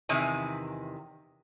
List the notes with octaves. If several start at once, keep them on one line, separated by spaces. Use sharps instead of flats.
E2 C3 D#3 G#5